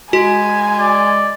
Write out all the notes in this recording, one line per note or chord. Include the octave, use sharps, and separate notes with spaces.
G#3 F#4 G#5
D5